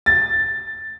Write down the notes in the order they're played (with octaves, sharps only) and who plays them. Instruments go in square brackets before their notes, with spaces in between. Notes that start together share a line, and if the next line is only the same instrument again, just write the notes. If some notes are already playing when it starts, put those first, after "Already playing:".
[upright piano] A6